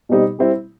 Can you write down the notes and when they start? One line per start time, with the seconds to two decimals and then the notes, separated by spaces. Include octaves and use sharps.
0.09 B2 G3 C4 D#4 G4
0.39 G3 C4 E4